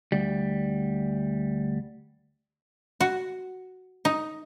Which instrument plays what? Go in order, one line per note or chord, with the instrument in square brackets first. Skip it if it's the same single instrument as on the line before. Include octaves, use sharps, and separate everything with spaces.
[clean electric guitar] D2 G3
[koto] F#4
D#4